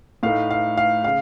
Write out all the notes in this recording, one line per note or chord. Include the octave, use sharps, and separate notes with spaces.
A2 A3 D#4 F5
F5
F5
C#3 F5